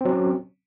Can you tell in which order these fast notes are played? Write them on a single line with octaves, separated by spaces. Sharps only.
C4 F#3 C#4